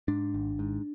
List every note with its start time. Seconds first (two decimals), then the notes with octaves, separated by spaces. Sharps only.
0.08 G#2 D4
0.34 G#1
0.59 G#2